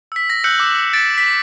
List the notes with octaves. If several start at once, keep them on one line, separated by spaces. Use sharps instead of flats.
E6 B6
A#6
E6 F#6 G6 A#6 C#7 F#7
D6 E6
A6 B6 D7 E7
B6